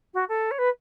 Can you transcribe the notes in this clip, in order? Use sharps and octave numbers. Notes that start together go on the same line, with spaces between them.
F#4
A4
C#5
B4